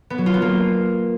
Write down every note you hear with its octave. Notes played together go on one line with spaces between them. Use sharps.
B3
F#3
F4
B3
A#3